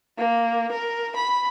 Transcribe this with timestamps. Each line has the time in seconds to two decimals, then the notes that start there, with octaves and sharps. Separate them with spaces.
0.18 A#3
0.72 A#4
1.16 B5